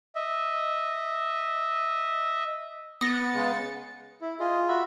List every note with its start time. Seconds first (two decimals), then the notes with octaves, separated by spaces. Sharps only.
0.15 D#5 E5
3.01 B3 D#6 A6 A#6 C#7
3.34 C#3 G#3
4.22 E4
4.40 F4 G#4 D#5
4.68 F#4 E5 B5